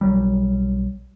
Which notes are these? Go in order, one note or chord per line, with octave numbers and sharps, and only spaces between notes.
B1 F#3 G3